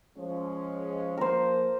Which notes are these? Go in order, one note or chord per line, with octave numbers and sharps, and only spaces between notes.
F3 G#3 C#4
F3 A#3 A#4 C5